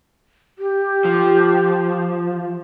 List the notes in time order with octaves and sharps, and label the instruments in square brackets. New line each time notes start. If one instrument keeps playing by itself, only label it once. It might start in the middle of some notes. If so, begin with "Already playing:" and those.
[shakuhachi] G4
[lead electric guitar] F3